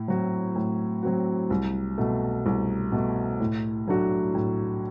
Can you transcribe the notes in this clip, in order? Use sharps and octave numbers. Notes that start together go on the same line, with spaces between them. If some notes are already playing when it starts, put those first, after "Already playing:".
Already playing: A2
F#3 C4 F#4
A2
F#3 C4 F#4
C2
B2 A3
C2
B2 A3
A2
F#3 A3 D4 F#4
A2